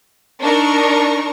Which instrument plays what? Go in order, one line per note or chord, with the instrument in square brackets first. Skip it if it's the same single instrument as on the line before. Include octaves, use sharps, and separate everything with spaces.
[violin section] D4 D#4 A#4 C#6